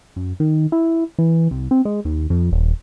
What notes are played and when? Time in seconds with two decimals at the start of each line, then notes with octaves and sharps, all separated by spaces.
0.16 F#2
0.40 D#3
0.72 E4
1.19 E3
1.51 C2
1.71 C4
1.85 G#3
2.05 D#2
2.30 F2
2.52 D#1